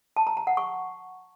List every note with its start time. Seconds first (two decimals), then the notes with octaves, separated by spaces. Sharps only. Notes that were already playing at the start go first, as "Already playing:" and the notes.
0.16 A5
0.27 A#5
0.37 A#5
0.47 F#5
0.57 C#6